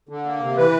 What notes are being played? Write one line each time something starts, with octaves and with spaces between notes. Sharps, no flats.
D3
A#3
C3
E3 B4